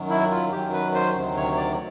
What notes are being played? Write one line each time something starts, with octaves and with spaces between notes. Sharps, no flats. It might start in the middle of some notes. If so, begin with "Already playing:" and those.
Already playing: F#2 D#3 F#3
E4
F4
F#2 D#3 F#3 G4
B4
C5
D2 C3 D#3 F#3
C#5
D5